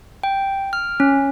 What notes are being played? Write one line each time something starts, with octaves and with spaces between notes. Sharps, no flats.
G5
F6
C#4